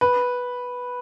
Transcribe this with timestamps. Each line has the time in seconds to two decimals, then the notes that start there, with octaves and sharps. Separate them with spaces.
0.01 B4